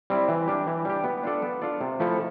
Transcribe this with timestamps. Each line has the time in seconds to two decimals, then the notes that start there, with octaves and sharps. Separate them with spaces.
0.10 G3 C4 E4
0.29 E3
0.48 G3 D4 G4
0.67 E3
0.85 G3 D4 G4
1.04 B3
1.24 D4 F4 A4 D5
1.42 B3
1.62 D4 F4 A4 D5
1.81 C3
2.00 F3 A3 E4 A4